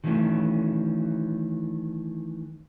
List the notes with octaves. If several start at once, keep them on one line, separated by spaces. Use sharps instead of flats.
D#3 E3 F#3 A3 C#4